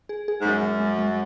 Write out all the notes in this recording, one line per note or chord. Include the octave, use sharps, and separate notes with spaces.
G#4
G#4
G#2
F#2 G#3
G#3
G#3
G#3